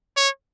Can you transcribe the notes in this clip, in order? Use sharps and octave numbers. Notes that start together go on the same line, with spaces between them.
C#5